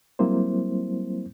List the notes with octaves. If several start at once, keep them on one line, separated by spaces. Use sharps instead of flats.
F#3 G3 A#3 C4 E4 C5